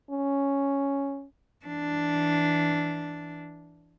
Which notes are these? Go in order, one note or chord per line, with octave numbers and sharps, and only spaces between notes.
C#4
E3 D4